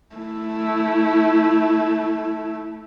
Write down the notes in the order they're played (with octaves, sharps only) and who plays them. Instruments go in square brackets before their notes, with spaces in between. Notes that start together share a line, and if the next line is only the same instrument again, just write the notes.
[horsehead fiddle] A3 E4